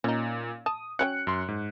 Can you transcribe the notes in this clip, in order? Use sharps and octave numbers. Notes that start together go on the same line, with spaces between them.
A#2 C#4 D#4
A5 D#6
F#3 C#4 G5 F#6 C#7
F#2 C6
G#2